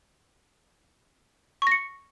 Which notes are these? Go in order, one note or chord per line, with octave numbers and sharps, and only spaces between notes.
C#6 A#6 C#7